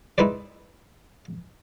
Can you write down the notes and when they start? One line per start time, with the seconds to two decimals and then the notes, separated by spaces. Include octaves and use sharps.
0.18 D#4 E4 G#4 B4 C5 D5